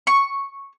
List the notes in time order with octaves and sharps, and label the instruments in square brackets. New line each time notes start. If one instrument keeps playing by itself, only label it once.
[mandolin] C#6